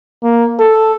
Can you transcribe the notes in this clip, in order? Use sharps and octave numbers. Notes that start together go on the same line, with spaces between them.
A#3
A4